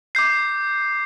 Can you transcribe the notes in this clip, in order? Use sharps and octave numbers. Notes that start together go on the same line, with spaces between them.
D6 G6 C7